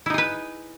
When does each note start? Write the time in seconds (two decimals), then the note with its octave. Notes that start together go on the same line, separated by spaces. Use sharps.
0.06 E4
0.10 D#4
0.14 G#4
0.18 B4